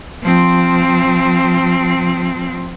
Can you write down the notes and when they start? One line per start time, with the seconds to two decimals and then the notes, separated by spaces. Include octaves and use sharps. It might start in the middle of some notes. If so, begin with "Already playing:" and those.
0.23 F3 C4